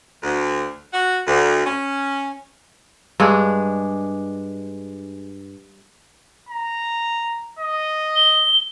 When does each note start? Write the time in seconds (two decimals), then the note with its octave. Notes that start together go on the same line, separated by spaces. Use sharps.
0.23 D2
0.93 F#4
1.26 D2
1.65 C#4
3.20 G2 G#3 D4 G#4
6.49 A#5
7.59 D#5
8.16 G7